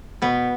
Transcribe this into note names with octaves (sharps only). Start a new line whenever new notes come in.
B2 B3